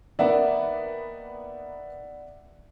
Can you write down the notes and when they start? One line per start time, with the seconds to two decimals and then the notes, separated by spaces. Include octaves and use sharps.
0.19 D#3 A#3 B3 D5 E5 F#5